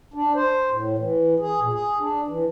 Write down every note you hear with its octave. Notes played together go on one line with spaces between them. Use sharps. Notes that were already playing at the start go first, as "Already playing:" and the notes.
D4
C5
A2
E3
G#4
A#2
G#4
D4
E3